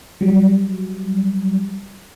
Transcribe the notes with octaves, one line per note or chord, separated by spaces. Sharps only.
F#3 G3